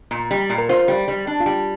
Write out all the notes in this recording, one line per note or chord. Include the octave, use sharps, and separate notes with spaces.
A#2
G3
A#2
A#4
F4 C5
G3
G3
D4
F4
G3 G4